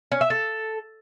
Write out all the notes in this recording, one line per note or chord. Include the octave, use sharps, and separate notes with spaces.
C#4
E5
A4